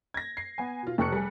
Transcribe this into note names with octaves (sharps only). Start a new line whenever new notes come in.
G#6 A#6
C7
B3 G#5
B2 F4
F1 G4 C#6 F#6 C#7
G3 G#4